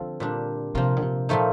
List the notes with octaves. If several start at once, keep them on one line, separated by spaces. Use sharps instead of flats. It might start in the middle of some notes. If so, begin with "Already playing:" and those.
Already playing: D3 F3 C4 F4 A4
A#2 G3 D4
C3 F3 A#3 F4
D3
C3
A#2 F3 A3 D#4